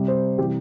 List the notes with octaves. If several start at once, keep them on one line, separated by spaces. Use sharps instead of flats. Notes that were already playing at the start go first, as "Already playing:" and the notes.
Already playing: C3 G3
C5
C3 E3 G3 G4